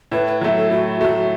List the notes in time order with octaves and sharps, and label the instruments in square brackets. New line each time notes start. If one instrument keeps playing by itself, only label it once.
[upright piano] A2 [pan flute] B4
[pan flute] B4
[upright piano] F#3 A3 [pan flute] F#4
[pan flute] A4
[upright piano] A2 [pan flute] F#4
[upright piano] F#3 A3 [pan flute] F#4